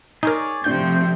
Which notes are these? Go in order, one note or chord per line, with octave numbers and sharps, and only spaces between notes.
D#4 G#4 A#4 C#5 D5
C3 F3 A3 C4 D4 G6